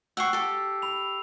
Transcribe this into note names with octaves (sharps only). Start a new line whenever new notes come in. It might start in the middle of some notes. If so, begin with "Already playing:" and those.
F#5 G5 C#6 E6 C7
G4 A4
B5 F7